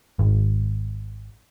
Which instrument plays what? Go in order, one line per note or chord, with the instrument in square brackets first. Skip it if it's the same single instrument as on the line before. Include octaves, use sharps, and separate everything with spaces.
[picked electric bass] G#1